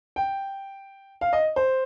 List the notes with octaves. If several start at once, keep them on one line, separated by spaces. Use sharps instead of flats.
G5
F5
D#5
C5